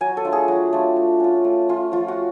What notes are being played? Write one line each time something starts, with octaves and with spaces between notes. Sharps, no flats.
F#3 G#5
A4
A3 D4 F4
G#4
F#3 F#4
A3 D4 F4
A3
C#4 F4
A3
C#4 F4
F3 F4
F#4